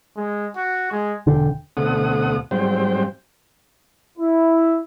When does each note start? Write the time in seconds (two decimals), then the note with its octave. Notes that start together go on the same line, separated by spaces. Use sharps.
0.16 G#3
0.56 F#4
0.91 G#3
1.27 E1 D3 G5
1.77 D2 B2 A3 C4 F#5 D#6
2.51 G#2 F#3 G3 C4 C5 G5
4.18 E4